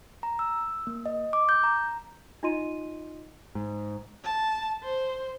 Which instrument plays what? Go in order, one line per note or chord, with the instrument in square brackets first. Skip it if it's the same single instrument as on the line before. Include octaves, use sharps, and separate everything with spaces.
[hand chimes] A#5
E6
A#3
D#5
D6
G6
A#5
[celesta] D#4 F4 D#5 C6 D#7
[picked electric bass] G#2
[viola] A5
C5